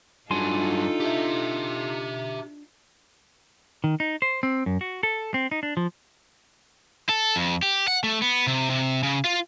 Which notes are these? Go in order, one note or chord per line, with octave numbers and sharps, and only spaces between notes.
G2 F#3 D4 D#4 F4 A4 G#5 C6
G4 E5
D#3
D#4
C5
C4
F#2
F#4
A4
C4
D#4
D4
F3
A4
F2
G4
F#5
A3
B3
C3
C3
C#3
F4